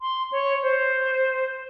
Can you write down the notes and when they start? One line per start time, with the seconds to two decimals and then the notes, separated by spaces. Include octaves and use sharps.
0.01 C6
0.32 C#5
0.63 C5